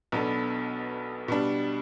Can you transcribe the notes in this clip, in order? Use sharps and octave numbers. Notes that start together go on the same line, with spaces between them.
B1 B2 B3 D4 A4
B2 G3 D4